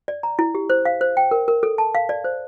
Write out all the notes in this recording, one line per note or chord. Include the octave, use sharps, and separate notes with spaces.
D5
A#5
E4
G4
C5
F5
C5
G5
A#4
A#4
A4
A5
F5
D5
C5